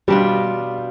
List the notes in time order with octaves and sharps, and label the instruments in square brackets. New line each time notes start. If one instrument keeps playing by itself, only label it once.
[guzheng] B2 D4 F4 [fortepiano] G3